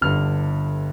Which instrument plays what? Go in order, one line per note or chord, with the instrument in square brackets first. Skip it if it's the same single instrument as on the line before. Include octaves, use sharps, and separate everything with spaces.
[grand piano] G1 G2 D3 F6